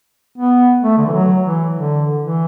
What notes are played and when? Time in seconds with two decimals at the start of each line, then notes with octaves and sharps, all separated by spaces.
0.38 B3
0.83 A3
0.98 D3
1.06 E3
1.13 F#3
1.44 E3
1.74 D3
2.19 E3